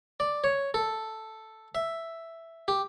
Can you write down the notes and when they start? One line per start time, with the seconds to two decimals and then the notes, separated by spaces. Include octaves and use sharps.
0.20 D5
0.44 C#5
0.74 A4
1.75 E5
2.68 G4